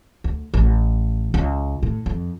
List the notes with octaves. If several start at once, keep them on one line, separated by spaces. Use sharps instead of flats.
D2
A1
C#2
A2
F2